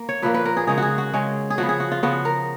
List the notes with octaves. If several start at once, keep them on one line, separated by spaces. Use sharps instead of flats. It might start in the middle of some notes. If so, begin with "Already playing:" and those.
Already playing: A#3
C#5
A#2 F3 A#3 B4
B4
A#4
G#4
C#3 G#3 C#4 G#4
F#4 G#4
F#4
C#3 G#3 C#4
G#4
C#3 F3 B3 F#4
G#4
F#4
F4
C#3 F3 B3 F#4
A#4